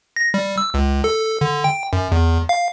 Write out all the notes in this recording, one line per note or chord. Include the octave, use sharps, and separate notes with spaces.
A#6
G3
E6
C#2
A4
D3
G5
F#2
E2
F5